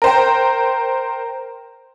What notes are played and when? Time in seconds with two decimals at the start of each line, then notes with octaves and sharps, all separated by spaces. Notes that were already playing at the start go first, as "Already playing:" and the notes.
0.02 A#4 C5 G5